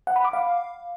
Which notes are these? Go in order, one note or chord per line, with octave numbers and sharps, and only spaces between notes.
F#5
B5
D6
F5